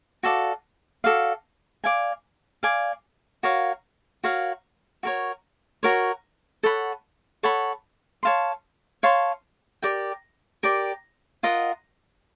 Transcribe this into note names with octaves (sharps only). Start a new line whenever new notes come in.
F#4 A4 D5 F5
F#4 A4 D5 F5
D5 F5 G#5
D5 F5 G#5
F#4 A#4 C#5 F5
F#4 A#4 C#5 F5
F#4 A#4 C#5
F#4 A#4 C#5
A4 C#5 F#5 B5
A4 C#5 F#5 B5
C#5 F5 A5 C6
C#5 F5 A5 C6
G4 A#4 D5 G5
G4 A#4 D5 G5
F4 A#4 D#5 F#5